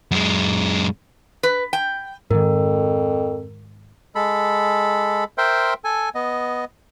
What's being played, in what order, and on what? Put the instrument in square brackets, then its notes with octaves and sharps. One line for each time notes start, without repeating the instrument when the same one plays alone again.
[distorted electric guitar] F#2 G#3
[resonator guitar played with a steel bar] B4
G5
[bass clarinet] F2 [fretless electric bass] G#2 D#3 [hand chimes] A#4
[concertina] G#3 A4 B5
A#4 C5 E5 G5 C6
A4 G#5
B3 D#5